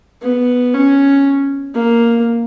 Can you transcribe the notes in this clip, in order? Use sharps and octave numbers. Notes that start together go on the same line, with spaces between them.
B3
C#4
A#3